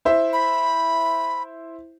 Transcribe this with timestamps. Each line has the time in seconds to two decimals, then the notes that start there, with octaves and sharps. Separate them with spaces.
0.05 E4 C5 E5
0.33 B5